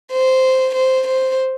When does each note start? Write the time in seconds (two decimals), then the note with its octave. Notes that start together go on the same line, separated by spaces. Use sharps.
0.12 C5
0.75 C5
1.08 C5